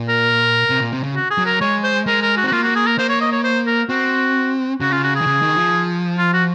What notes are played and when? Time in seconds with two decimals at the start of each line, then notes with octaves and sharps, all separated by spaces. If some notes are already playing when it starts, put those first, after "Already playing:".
Already playing: A#2
0.09 A#4
0.70 C3
0.80 A#2
0.92 C3
1.03 C#3
1.15 F#4
1.30 G#4
1.38 F#3
1.46 A#4
1.61 G#3 C#5
1.84 C5
2.06 G#3 A#4
2.22 A#4
2.37 F#4
2.44 C4
2.47 F#4
2.52 A#3 F4
2.63 F#4
2.76 G#4
2.87 A#4
2.98 A#3 C5
3.09 C#5
3.21 D#5
3.32 C#5
3.44 C5
3.67 A#4
3.89 C4 F#4
4.81 C#3 F#4
4.92 F4
5.04 F#4
5.16 G#4
5.21 D#3
5.27 C#3
5.42 D#3
5.57 F3
6.18 F4
6.33 F#4